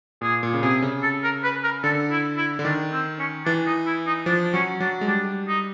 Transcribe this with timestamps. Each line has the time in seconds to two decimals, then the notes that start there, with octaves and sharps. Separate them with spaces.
0.21 A#2 G#4
0.43 A#2
0.54 C#3
0.62 C3 G#4
0.82 C#3
1.03 A4
1.24 A#4
1.44 B4
1.64 A#4
1.84 D3 A4
2.11 E4
2.37 E4
2.59 D3
2.65 D#3 D4
2.92 C4
3.19 C#4
3.45 E3 D4
3.67 D#4
3.86 E4
4.06 D#4
4.26 F3 D4
4.54 F#3 C#4
4.80 F#3 D4
5.01 G#3
5.07 G3 D4
5.48 D#4